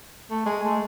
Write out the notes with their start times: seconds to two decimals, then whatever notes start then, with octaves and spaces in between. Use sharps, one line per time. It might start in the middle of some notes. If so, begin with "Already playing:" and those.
0.30 A3
0.46 G#3
0.63 A3